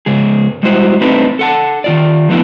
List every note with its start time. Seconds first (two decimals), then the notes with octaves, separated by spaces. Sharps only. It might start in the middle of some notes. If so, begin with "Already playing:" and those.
0.06 G#2 C#3 G#3 G#4
0.63 G3 G#3 E4 F#4 C5
1.01 A3 C4 D4 D#4 B4
1.39 A4 F#5 A5
1.84 D#3 F4 D5
2.29 F3 A3 B3 C#4 D4 E4